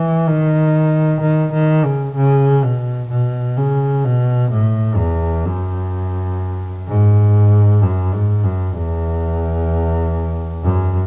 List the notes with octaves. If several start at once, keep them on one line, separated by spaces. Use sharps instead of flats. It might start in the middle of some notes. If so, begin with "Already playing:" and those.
Already playing: E3
D#3
D#3
D#3
C#3
C#3
B2
B2
C#3
B2
A2
E2
F#2
G#2
F#2
G#2
F#2
E2
F#2